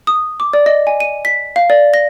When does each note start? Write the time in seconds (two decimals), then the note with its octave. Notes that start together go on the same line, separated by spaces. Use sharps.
0.07 D#6
0.40 D6
0.53 D5
0.66 D#5
0.87 G#5
1.00 D#7
1.25 B6
1.56 F5
1.70 D5
1.94 A#6